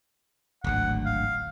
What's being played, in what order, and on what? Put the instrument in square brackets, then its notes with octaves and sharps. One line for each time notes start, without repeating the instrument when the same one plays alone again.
[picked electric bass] D1 G#1 D2 [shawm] F#5
[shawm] F5